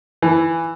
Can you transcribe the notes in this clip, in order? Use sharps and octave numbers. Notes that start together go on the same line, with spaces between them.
E3